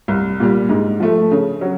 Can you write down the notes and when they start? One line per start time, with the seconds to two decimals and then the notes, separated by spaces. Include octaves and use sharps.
0.08 C2
0.40 A#2 G3
0.69 G#2
1.00 F3 A3
1.31 C#3
1.61 F#3